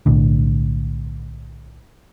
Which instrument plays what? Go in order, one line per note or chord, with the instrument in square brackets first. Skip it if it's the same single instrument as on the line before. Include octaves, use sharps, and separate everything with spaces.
[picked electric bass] B1 A2 D3